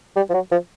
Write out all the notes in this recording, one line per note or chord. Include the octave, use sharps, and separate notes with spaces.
G3
F3
F#3
F3